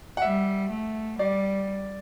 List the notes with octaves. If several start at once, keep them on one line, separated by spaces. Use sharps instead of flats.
F#5
G3 E5
A3
G3 D5